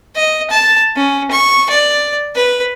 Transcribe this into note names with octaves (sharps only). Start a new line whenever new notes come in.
D#5
A5
C#4
C#6
D5
B4